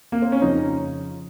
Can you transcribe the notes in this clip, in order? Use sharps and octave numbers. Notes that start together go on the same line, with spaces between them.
A#3
C4
C#4
F2 C#3 F3 D#4